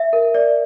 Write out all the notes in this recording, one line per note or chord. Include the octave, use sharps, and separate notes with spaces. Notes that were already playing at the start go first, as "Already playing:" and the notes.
Already playing: E5
A#4
D5